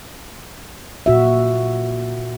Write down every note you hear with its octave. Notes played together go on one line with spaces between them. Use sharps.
A#2 F#4 E5